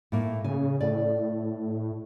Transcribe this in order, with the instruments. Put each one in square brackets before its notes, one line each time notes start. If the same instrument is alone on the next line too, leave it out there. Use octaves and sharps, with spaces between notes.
[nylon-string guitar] A2 A#3
[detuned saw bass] C#3 [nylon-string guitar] G#5
[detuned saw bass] A2 [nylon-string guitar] D5